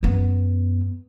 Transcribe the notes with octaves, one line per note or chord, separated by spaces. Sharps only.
F#2 B3